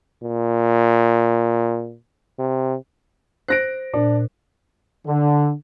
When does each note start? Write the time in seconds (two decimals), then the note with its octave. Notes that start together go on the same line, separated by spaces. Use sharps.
0.23 A#2
2.39 C3
3.48 C5 F#6 A#6 D7
3.94 A#2 D4
5.07 D3